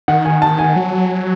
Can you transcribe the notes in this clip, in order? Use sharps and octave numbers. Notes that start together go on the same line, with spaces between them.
D#3 F#5
G#5
A5
G#5
F#3